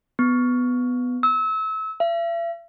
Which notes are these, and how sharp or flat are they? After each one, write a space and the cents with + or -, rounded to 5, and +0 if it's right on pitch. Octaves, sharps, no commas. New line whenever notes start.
B3 +10
E6 -30
E5 +45